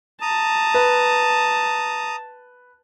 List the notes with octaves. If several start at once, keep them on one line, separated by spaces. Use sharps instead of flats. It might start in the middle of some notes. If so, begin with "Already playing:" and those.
A5 A#5 D#6
B4